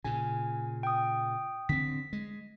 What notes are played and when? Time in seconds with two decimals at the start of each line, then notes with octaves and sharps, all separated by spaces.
0.04 A#2 C#3 G#5
0.83 G5 D#6
1.69 D3 C4 B6
2.13 G#3